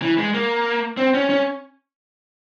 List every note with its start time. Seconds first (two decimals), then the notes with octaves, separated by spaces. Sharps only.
0.02 E3
0.18 G#3
0.34 A#3
0.97 C4
1.14 C#4
1.30 C#4